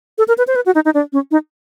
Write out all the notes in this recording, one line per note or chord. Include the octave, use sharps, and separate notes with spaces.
A4
A#4
B4
C5
B4
F#4
D#4
D#4
D4
C#4
D#4